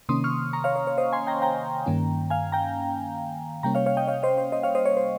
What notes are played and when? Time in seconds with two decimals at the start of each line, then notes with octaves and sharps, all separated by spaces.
0.09 C3 D#3 A#3 C#4 C6 D#6
0.24 C#6 F6
0.53 A#5 C#6
0.64 C#5 F5
0.76 C#5
0.87 C#5
0.98 C5 D#5
1.13 G#5 C6
1.27 G5 A#5
1.42 G5 A#5
1.86 G2 D#3 A#3 C#4
2.30 F5 G#5
2.52 G5 A#5
3.63 C3 G3 A#3 C#4 G5 A#5
3.75 C#5 F5
3.86 C#5 F5
3.97 D#5 G5
4.08 C#5 F5
4.23 C5 D#5
4.38 C5
4.52 C5 D#5
4.63 C#5 F5
4.75 C5 D#5
4.86 C#5
4.97 C5